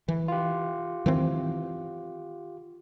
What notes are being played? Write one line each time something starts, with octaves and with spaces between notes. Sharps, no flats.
E3
F4 G4
D#3 E3 C4